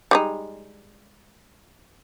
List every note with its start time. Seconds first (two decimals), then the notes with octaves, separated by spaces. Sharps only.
0.11 G3 G#3 D#4